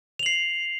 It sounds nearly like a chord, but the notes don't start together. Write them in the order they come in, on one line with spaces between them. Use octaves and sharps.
F7 F#7 C7